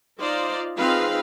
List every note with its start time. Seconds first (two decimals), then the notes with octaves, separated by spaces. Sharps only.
0.19 D#4 F4 C5 D5 D#5 F5
0.76 F3 C4 D#4 G#4 B4 F5